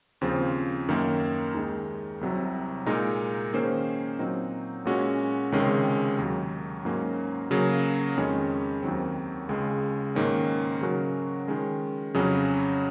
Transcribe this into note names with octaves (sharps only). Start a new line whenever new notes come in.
D#2 C#3 F3 C4
F#2 D#3 A#3
D#2 D#3 G#3 D#4
C2 C3 F#3
A#2 G#3 D#4 A#4
D#3 A#3 C#4 G#4 C5
A#2 F#3 C4 D#4
A#2 G#3 C#4 F#4
C#2 C3 D#3 G#3 C#4
D#2 D#3 F#3
G#2 F#3 A#3 C#4
C#3 F#3 A#3
F2 D#3 G#3 C#4
D#2 D#3 F#3 C4
C#2 C#3 G#3
G#2 D#3 A#3 C#4
C#3 F#3 C#4 F#4 A#4
D#3 G#3 C#4
F2 C#3 F#3 C#4